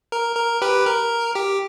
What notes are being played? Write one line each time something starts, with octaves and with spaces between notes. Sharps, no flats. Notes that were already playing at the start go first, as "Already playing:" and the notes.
A#4
A#4
G4 B4
A#4
G4